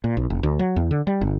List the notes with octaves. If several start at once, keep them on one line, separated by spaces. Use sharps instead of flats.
A#2
B1
F1
D2
F#3
E2
D3
G3
G1